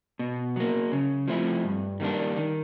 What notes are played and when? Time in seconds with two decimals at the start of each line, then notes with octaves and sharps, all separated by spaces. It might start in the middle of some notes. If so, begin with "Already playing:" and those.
0.19 B2
0.56 F#3 A#3
0.92 C#3
1.28 F3 A3 C4 E4
1.64 G2
2.00 D#3 G3 A#3 D4
2.36 D#3